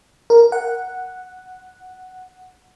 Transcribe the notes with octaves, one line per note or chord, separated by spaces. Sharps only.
A#4
F#5